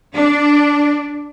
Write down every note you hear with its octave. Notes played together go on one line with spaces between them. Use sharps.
D4